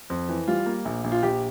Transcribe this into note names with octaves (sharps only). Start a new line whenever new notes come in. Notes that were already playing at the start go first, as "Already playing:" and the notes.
F2
E3
G3 F4
A#3
A#1
A#1
F4
A#1 G4